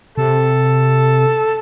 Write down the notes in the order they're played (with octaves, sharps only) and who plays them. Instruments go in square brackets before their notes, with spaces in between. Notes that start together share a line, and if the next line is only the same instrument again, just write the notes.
[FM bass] C3 [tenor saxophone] A4